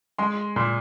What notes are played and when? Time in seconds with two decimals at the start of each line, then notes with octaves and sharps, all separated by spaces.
0.18 G#3 C6
0.56 A#2 C6